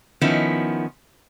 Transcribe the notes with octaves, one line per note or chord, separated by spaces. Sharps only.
D#3 F3 B3 C#4 E4